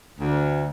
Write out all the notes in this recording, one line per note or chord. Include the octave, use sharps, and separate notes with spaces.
D2